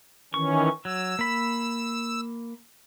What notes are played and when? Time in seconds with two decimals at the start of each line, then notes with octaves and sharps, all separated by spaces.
0.34 D#3 E3 C#4 C#6
0.85 F#3 E6
1.19 A#3 B5